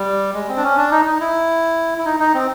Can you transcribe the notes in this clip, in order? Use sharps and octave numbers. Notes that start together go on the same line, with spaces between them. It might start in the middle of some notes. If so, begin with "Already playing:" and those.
Already playing: G3
G#3
C4
D4
C#4
D4
D#4
D#4
E4
E4
D#4
D#4
C4